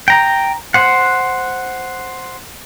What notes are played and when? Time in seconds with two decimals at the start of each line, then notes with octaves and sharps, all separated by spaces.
0.08 G5 A#5
0.74 C5 F#5